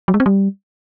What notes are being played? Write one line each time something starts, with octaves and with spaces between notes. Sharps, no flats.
F#3
G#3
C4
G3